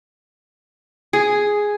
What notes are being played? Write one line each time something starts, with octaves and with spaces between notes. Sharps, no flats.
G#4